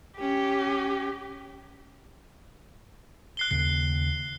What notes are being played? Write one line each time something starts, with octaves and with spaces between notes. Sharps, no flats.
C#4 G4
F#6 C7 G7
D#2 C#3 C7